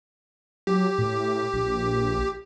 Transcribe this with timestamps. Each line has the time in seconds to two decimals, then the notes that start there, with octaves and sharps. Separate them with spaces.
0.67 F#3 G4
0.99 A2
1.53 A#1